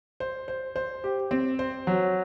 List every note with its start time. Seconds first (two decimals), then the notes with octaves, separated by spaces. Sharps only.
0.20 C5
0.48 C5
0.76 C5
1.04 G4
1.31 C4
1.59 C5
1.87 F#3